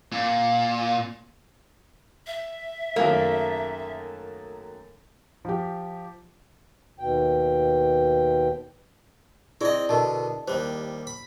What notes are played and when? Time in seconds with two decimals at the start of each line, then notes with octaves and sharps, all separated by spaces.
0.12 A#2
2.27 E5
2.96 F#2 D#3 A3 A#3
5.45 F3 G4
6.99 D#2 B2 G5
9.61 C4 E4 G#4 D5 D#5
9.89 B2 D3 A#4 D#5 A5
10.48 D#2 G3 C5
11.07 B5